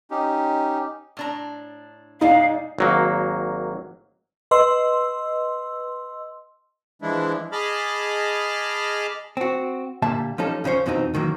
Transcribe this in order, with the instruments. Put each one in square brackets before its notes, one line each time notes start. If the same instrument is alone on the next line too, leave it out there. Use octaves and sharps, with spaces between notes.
[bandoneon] C#4 D#4 G4
[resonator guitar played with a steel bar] A2 D4 A#5
[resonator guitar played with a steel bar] B2 G#3 D5 [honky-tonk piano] D#4 [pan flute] F5
[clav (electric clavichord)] G#1 F#3 A#3
[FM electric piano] B4 D#5 C6 E6
[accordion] E3 F3 G#3 D4 E4
G#4 D#5 A5 B5 D6 F6
[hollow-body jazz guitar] C4 F#4
A#2 D3 G3 A#3 E5 A5
F3 G3 C#4 D#4 A4
C#2 C#3 C#4 C5 C#5
F2 B2 E3 C4 C#4 D#4
C#2 D#3 E3 F#3 A#3